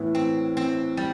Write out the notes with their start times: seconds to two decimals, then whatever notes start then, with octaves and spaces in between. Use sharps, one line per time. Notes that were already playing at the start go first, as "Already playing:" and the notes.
Already playing: A2 E3 B3 E4
0.15 C4
0.57 C4
0.97 G3